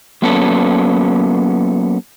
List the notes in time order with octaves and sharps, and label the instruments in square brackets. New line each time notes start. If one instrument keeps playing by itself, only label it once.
[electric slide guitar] F#3 A#3 B3 C#4 A4